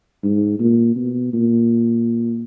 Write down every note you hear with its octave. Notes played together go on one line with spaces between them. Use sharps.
G#2
A#2
B2
A#2